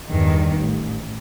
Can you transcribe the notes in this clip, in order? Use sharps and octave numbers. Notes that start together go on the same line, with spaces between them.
E2 G2 D#3
A1